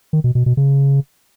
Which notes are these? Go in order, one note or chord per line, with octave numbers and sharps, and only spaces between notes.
D#3
B2
B2
B2
C#3